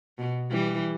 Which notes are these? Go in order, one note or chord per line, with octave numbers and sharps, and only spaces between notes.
B2
E3 G3